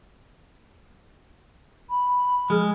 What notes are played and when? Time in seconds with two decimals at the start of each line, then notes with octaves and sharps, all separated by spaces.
1.89 B5
2.50 F3 G#3 G#4 F6